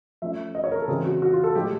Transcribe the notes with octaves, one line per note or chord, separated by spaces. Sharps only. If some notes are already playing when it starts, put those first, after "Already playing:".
F3 A3 C#4 E5
D#5
C#5
A#4
A4
C#3 E3 G#3 C4 G#4
F#4
F#4
F4
A4
A2 F3 G#3 G4